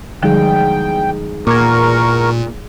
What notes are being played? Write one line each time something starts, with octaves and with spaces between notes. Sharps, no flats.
E2 D3 F3 G3 G#3 D#4 G#4 G5
E2 A#2 A#4 C#6 D6 G#6